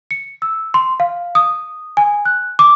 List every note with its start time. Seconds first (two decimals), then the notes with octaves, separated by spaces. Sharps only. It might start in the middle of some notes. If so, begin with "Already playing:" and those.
0.11 C#7
0.42 E6
0.74 C6
1.00 F5
1.35 D#6
1.97 G#5
2.25 F#6
2.59 D6